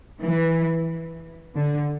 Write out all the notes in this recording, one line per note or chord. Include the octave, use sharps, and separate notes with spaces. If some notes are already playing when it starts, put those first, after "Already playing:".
E3
D3